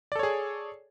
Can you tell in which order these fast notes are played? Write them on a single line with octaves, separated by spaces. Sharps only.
D5 A4 C#5 G#4